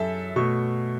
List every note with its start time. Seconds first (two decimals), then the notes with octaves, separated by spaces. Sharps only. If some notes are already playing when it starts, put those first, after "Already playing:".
Already playing: F#2 A4 E5
0.36 B2 A3 C#6